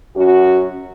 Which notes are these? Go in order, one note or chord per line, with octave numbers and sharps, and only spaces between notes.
F#2 C#4 F#4